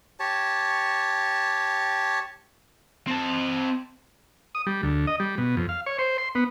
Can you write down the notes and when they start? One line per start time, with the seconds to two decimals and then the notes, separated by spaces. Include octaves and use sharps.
0.20 G4 C#5 A5
3.07 C4 A5
4.55 D#6
4.67 G3
4.83 D2
5.07 D#5
5.20 G3
5.38 B2
5.57 F2
5.69 F5
5.86 C#5
5.99 C5
6.18 C6
6.35 B3